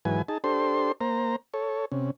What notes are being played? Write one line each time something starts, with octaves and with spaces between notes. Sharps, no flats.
G#2 E3 F#3 B4 G#5
D#4 G#4 A5
D4 G4 A4 C5 C6
A#3 C5 A#5
A4 C#5
C3 C#4